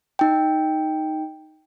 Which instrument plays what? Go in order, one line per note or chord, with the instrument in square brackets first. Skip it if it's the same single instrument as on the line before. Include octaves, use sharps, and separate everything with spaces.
[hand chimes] D#4 G5